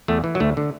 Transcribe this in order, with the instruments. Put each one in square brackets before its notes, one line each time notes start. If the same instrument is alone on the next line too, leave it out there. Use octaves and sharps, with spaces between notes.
[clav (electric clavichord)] E2 A3
E3
F#3
D2 A3
D3